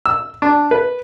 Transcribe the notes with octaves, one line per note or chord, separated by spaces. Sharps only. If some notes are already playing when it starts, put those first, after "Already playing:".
E6
D4
B4